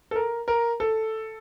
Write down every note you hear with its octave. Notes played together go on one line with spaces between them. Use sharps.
A4
A#4
A#4
A4